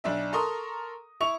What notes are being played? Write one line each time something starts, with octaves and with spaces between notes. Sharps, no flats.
B1 D4 E5
A4 A#4 A#5 C6 C#6 D#6
E4 C#6 F7